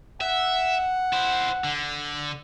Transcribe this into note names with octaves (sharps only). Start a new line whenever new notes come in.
E5 F#5
E4 C5
D3